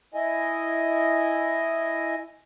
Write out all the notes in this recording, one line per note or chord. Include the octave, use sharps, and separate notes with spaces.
E4 D#5 G#5